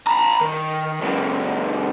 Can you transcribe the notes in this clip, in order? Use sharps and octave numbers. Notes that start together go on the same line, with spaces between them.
A#5 B5
D#3
C#2 F#2